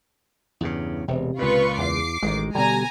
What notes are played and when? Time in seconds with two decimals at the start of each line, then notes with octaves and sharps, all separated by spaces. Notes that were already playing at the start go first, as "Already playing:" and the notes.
0.61 E2 G2 C#3
1.08 E1 C3
1.39 C#2 A#2 F4 B4 C#6
1.78 E2 D6 C7
2.23 A1 D#3 E3 G#3
2.55 B2 D3 G3 G#5 A#5